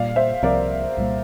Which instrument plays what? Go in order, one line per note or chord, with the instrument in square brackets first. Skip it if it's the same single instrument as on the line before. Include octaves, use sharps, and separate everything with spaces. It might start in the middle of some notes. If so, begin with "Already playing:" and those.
Already playing: [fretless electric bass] A#2 G3 A#3 [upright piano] D5 F5
[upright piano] C5 E5
[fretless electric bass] C2 C3 F3 C4 [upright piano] A#4 D5
[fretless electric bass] C2 A#2 G3 A#3